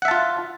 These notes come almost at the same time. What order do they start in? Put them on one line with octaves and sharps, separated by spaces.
F#5 E5 A5 F4